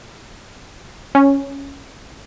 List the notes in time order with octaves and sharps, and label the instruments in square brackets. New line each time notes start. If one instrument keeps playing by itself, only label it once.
[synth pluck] C#4